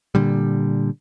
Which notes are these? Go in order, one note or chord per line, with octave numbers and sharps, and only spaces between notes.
A#2 D3 G3